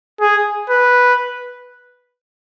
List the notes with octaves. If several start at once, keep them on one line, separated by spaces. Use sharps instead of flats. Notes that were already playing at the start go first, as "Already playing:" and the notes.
G#4
B4